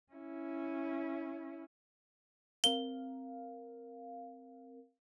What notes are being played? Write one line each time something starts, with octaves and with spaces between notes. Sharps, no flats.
C#4 E4
C4 A#4 F5 G7